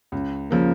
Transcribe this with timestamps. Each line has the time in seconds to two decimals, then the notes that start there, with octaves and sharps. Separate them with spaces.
0.12 C#2
0.51 C#3 F3 A#3